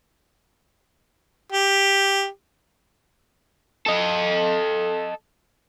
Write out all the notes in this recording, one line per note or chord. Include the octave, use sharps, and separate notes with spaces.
G4
A4 D#5